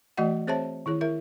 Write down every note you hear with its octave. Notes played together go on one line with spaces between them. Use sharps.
E3 A3 F#4 D5 D#5 F#5
C4 G#4 C5 C#5 E5 A5
D#3 E4 G#4 C#5
E4 A#4 E5